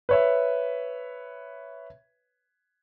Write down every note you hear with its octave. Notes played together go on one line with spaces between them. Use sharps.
B4 C#5 E5